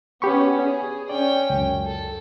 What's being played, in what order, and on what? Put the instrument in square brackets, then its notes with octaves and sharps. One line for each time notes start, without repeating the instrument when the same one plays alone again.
[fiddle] B3 C#4 [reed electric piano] G4 B5 C#6
[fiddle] G#4
[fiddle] C#4 G5 [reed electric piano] D5
[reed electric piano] C#2 F#2
[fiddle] A4